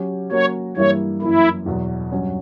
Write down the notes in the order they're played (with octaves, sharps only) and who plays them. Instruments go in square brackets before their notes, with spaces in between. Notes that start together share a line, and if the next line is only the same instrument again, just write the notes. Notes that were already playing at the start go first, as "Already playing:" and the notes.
Already playing: [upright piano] F#3 C#4 G4
[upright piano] F#3 A#3 C#4 F#4 A#4 [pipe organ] C#5
[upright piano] G2 E3 G3 A#3 E4 [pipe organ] C#5
[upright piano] F#2 E3 A#3 [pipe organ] E4
[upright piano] E2 B2 F#3
G2 F#3 C#4